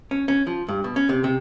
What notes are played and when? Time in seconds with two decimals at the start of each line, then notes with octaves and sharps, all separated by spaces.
0.11 C#4
0.28 C#4
0.47 F3
0.69 G2
0.84 B2
0.96 C#4
1.09 C3
1.24 C3